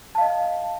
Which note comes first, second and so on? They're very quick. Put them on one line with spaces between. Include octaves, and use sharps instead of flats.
A5 F5 D#5